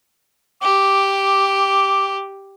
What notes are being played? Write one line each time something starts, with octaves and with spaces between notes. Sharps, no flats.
G4 D6